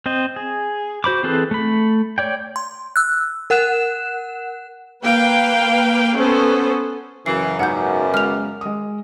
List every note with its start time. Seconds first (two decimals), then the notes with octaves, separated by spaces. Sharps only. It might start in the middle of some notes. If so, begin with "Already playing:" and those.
0.06 C4 C5 D#5
0.36 G#4
1.04 F#4 C5 B5 D6
1.23 E3 C4 G#4 A4 B4
1.51 A3 B5
2.18 C#5 D5 G5
2.56 C6
2.96 E6 F#6
3.50 A#4 F#5 F#6 E7
5.04 A#3 B4 F5 G5
6.16 B3 C#4 A4 C5
7.26 F#2 C#3 E3 C7
7.59 G#2 C#3 F#3 G3 B3 F#5 G6
8.14 G#3 F6 F7
8.61 G#3 D#6